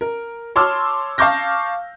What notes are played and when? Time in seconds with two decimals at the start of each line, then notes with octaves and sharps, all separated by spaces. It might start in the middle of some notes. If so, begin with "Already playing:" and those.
0.01 A#4
0.56 C#5 A5 C6 D6 E6 F6
1.18 F5 A5 C#6 D6 G6 A#6